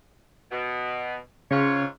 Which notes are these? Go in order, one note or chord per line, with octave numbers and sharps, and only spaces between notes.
B2
G#2 C#3 F4 C#5